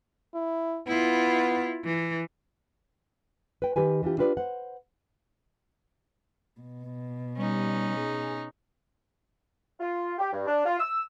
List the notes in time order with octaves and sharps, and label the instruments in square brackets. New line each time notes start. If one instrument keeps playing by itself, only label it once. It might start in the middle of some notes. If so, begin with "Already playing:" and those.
[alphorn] E4
[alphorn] B3 [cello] E4 F4
[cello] E3
[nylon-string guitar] B4 G5
D#3 G4 B4 G#5
E3 D4 F4 G4
D4 F4 G4 B4 C5 D5
C5 F#5
[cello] B2
[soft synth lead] G3 [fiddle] C#4 D#4
[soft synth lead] G#4
[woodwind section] F4
G4
G2
D4
F4
E6